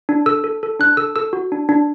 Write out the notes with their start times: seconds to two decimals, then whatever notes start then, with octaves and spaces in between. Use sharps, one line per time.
0.09 D4
0.26 A4 E6
0.44 A4
0.63 A4
0.79 D4 F#6
0.97 A4 E6
1.16 A4 E6
1.33 F#4
1.52 D4
1.69 D4